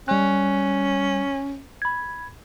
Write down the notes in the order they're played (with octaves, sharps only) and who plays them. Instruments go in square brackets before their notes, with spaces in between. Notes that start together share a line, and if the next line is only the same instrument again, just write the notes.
[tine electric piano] G3 F#6 [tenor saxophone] C#4
[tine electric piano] B5 G#6